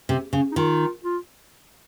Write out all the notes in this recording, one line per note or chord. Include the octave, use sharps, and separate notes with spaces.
C3
C#3
D#4
D#3 F4
F4